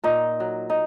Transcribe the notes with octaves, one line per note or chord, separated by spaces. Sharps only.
A#2 D#4
F#3
D#4